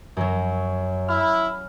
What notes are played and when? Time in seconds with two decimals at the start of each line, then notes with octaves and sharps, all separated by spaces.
0.17 F#2 F#3
1.08 E4 F6